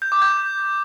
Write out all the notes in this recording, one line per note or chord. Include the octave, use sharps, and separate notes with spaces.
G6
D6
G6